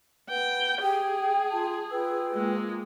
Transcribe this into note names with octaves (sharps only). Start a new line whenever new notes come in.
B4 F#5 G5
G4 G#4 G5
F4 G5 A5
F4 B4 G5 E6
G#3 A#3